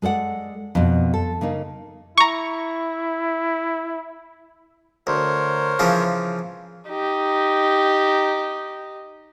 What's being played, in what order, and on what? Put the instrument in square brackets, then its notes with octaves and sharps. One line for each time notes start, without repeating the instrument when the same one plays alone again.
[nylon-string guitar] G#3 A4 D5 F#5
F2 B2
A4
C#3 A#3 D#4
[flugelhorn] E4 [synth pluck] A#5 C#6
[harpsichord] D2 [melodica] A#4 C5 C#5
[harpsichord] C#3 E3 F3
[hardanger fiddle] D#4 G4